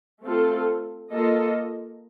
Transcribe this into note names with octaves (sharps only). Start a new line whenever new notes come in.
A3 C4 F4 A4
A#3 F4 A4 D#5